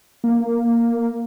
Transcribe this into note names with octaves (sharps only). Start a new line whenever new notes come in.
A#3